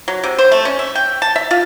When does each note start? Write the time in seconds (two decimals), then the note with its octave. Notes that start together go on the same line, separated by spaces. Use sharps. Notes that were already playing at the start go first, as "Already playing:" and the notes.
0.08 F#3
0.24 C3
0.39 C5
0.52 A3
0.65 C#4
0.79 E5
0.95 G5
1.22 A5
1.36 E5
1.51 F4